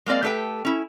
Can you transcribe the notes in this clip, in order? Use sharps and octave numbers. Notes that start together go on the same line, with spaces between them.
G#3 A#3 C4 D5 F5
A3 G4 A4 B4 G5
C#4 E4